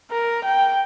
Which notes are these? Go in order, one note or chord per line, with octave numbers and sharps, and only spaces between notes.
A#4
G5